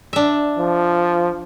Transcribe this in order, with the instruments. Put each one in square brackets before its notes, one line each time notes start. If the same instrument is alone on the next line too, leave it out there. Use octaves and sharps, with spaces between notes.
[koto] D4 E5
[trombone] F3